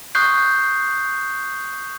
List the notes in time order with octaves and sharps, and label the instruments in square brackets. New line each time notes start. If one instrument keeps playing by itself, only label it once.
[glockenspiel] C#6 D#6 F#6 G6 C7